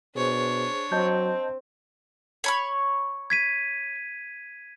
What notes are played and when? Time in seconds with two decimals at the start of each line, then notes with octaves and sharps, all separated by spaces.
0.16 B2 D4 G#4 C5 C#5
0.92 F#3 C4 D#5 A5 G6
2.44 C#5 B5 C#6
3.30 G#6 B6 D#7